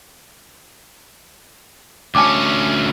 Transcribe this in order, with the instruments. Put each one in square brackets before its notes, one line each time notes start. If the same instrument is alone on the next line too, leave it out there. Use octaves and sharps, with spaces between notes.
[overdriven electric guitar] D2 C#4 [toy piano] G#5 A5 D6